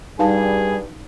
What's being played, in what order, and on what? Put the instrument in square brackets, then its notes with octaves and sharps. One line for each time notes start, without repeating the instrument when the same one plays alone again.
[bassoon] G2 [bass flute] G3 [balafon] D#4 F5 A5 [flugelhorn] G#4